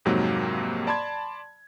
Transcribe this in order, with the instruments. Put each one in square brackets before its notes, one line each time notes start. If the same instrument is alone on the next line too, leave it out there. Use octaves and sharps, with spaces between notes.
[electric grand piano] F2 G#2 C3 F#3 A#3
D5 A5 B5 C6 G#6